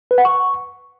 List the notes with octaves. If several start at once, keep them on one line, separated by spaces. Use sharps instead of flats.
B4
F#5
C#6